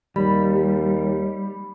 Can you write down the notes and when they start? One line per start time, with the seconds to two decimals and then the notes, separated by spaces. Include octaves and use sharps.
0.16 D#2 G3 B5